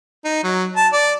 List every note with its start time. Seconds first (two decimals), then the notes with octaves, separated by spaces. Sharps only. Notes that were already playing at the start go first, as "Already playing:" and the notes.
0.25 D#4
0.44 F#3
0.76 A5
0.93 D5